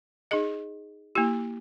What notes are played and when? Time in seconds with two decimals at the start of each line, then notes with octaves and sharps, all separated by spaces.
0.31 D#4 G#4 D#5
1.15 A#3 E4 G4